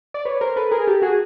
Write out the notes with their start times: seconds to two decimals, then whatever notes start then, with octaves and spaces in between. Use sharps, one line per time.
0.14 D5
0.25 B4 C#5
0.41 A#4 C5
0.56 A4 B4
0.71 G#4 A#4
0.87 G4 A4
1.02 F#4 G#4